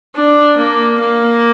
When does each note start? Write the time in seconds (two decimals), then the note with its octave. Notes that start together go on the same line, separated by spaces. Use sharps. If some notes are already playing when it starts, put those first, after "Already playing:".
0.16 D4
0.57 A#3
1.00 A#3